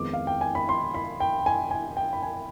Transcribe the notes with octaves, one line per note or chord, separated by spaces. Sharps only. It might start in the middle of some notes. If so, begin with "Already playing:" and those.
Already playing: F2 D#3 G#3 B3 D6
F5
G5
G#5
B5
C6
B5
G5
G#5
G#5
G5
B5
G#5